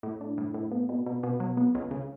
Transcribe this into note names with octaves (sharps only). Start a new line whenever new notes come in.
A2
D4
A2
A2
B2
B2
B2
B2
F#3
B3
C#2
C#3